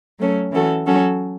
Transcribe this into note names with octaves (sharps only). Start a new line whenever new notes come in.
F#3 A3 C#4 A4
E3 C#4 F#4 A4
F#3 C#4 F#4 A4